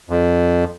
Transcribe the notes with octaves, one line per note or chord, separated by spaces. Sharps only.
F2